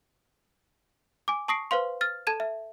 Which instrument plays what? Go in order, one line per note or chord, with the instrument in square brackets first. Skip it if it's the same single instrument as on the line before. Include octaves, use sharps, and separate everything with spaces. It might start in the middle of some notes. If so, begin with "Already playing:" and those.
[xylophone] G#5 D6
A5 C#6 D#6 A#6 C7 D7
B4 C5 F5 C6
F6 A6
A4 A5 G#6 D#7 E7
E5